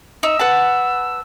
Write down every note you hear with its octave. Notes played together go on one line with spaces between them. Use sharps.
D#4 E6
B4 F#5 A5